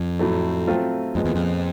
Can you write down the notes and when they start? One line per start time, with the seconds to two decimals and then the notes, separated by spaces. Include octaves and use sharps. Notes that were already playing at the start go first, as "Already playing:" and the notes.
Already playing: F2
0.19 A2 F#3 A3
0.67 F#3 A3 C4 F4
1.15 F2 A#2 F3 G#3 B3
1.25 E2
1.35 F2